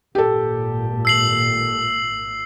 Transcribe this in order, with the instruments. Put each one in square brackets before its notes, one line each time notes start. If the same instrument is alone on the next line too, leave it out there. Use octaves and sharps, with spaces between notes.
[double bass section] G#1 A#2 [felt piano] G4 A4
[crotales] E6 C7 F#7